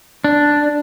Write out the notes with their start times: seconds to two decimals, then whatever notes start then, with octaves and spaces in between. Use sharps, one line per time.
0.24 D4